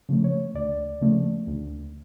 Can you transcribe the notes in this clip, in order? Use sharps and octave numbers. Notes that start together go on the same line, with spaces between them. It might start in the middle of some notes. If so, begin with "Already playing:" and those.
C#3 F3 A3
C#5
D2 D5
C#3 F3 A3
D2